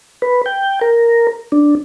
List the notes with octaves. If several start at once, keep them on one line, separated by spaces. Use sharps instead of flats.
B4
G5
A#4
D4